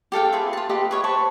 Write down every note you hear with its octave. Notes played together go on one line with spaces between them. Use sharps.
G4 A4 F5 G5
F4 G#4 B4 E5
F4 A5
G4 A4 B4 D#5
B4 C#5 E5 D#6
B4 C5 A5 C#6